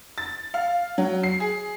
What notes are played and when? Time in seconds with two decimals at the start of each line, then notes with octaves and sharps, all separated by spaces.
0.18 A6
0.54 F5
0.98 F#3
1.23 C7
1.40 G#4